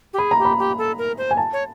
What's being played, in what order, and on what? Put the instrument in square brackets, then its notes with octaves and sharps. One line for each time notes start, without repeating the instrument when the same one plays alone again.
[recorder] G4
[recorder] G#4 [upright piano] B5
[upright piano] A#5
[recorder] G4
[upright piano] B5
[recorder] G4
A4
A#4
C5
[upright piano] G#5
A5
[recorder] C#5